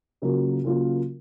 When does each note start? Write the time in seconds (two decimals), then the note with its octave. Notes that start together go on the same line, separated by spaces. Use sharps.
0.22 C#3 F#3 A#3 F4 A#4
0.64 C#3 F#3 A#3 F4 A#4